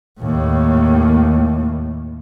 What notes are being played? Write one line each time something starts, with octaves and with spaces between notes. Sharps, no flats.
D#2 A2